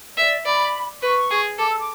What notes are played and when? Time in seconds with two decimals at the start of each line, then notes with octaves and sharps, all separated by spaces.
0.17 D5 E5
0.45 D5 B5
1.02 B4 C#6
1.31 G#4
1.59 A4 D6
1.69 E6
1.79 D6